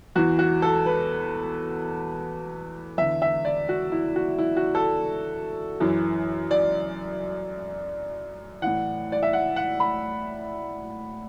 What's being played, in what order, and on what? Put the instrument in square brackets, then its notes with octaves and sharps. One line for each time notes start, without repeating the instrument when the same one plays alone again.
[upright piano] E2 E3 F#4
F#4
A4
B4
E2 D3 E5
E5
D5
F#4
E4
F#4
E4
F#4
A4
F#2 E3
D5
A2 E3 F#5
D5
E5
F#5
F#5
B5